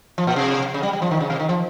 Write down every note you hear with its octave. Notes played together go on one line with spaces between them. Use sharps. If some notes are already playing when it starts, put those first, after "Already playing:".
F3
A#2
C3
C#3
G3
G3
F3
D#3
C#3
C3
D#3
F3